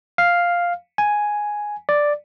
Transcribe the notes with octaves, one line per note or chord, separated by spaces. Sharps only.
F5
G#5
D5